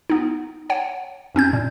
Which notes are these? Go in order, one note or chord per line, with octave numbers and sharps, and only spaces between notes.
B3 D#4
C#5 F#5
F#2 C4 C#4 G6
A#2